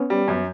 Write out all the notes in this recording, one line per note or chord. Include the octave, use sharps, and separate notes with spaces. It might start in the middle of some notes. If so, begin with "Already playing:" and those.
Already playing: B3 C#4
G3
F#2